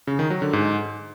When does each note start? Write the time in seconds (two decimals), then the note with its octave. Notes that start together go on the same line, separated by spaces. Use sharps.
0.07 C#3
0.19 D#3
0.30 F#3
0.42 D3
0.53 G#2